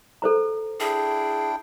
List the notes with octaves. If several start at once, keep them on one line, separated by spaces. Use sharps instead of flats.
A4 C5 A#5
D4 E4 G#4 G5